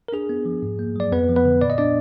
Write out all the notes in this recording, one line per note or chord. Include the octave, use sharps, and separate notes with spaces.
A#4
D4 G#4
B3
F3
G#2
A#3
F#3 D5
F2 B3 B4
F3
B3 B4
D3
A#2 D5
D#5
B3 D4 D5